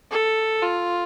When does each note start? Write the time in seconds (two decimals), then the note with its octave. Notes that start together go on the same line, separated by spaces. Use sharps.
0.11 A4
0.62 F4